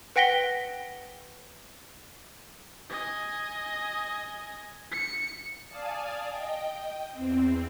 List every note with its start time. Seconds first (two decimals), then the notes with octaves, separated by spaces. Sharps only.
0.16 B4 F#5 G5 A#6 B6 G7
2.90 D#5 G#5
4.92 C#7
5.69 D5 F5 G#5 A5 D#6
6.30 D#5 G5
7.12 E2 C4